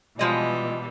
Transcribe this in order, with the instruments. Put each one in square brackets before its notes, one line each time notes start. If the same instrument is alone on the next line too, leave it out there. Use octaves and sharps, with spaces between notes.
[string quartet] B2 E3 G3 [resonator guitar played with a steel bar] F3 G#3 D#5